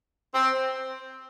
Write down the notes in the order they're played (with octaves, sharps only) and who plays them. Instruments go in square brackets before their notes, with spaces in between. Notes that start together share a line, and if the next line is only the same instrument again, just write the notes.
[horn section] C4